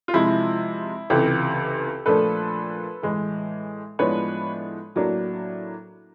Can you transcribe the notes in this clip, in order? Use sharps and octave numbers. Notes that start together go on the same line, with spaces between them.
F4
C3 F3 G#3 E4
C#2 C3 E3 G4 A4
A#2 F3 A3 D4 A4 B4
A2 E3 G#3
A2 F3 G#3 B3 D4 B4 C#5
A2 F#3 A#3 D4